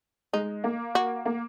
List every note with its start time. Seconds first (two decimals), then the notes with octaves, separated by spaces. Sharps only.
0.33 G#3 D#4
0.64 A#3
0.95 F#4
1.25 A#3